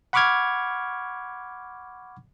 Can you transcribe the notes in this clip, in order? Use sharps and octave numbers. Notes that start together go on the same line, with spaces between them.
F#5 B5 C#6 D6 F6 G#6